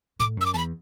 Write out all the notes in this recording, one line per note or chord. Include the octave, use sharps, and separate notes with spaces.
A2 D6
F#2 E6
D6
E2 A5 B5